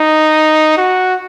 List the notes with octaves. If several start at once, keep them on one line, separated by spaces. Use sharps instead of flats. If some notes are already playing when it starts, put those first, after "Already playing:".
Already playing: D#4
F#4